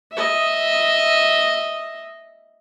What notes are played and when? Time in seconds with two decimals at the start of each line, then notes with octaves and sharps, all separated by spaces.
0.12 D#5 E5